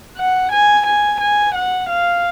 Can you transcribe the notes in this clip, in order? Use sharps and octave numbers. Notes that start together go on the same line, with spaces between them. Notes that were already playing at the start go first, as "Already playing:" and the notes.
F#5
G#5
G#5
G#5
F#5
F5